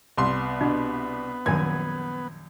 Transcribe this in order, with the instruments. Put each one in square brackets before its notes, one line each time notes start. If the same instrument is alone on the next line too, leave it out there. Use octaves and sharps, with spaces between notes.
[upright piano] C2 C6 [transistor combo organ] B3
[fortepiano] B2 [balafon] D4
[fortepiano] A#1 F#2 G#5 [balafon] D#3 [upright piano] G#6